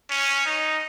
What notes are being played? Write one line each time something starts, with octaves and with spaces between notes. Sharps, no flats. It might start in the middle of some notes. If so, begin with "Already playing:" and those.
C#4
D#4